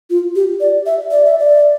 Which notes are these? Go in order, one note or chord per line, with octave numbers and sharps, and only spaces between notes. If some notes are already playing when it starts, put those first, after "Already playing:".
F4
G4
D5
E5
D5
E5
D5